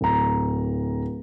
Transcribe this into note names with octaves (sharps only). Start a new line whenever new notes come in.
D1 A#5